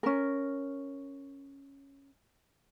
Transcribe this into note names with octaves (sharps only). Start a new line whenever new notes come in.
C#4 A#4